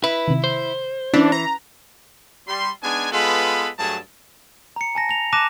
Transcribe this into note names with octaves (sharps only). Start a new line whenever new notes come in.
E4 B4
C3 D#3
C5
E3 C#4 D4 E4
A#5
G3 C6
G#3 B3 D4 D#4 G#5
G#3 B3 F4 A4 B4 B5
G2 F#3 A3 G#4 A5
A#5 C#7
G#5 A5 A#6
A#6 F7
A5 D6 F#6 A#6 D#7 E7